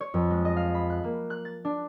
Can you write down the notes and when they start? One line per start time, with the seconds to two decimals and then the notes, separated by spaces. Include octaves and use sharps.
0.01 C#5
0.14 F2
0.30 G#3
0.45 D#5
0.56 F5
0.74 B5
0.90 F#6
1.04 A#3
1.30 F#6
1.45 A6
1.65 D4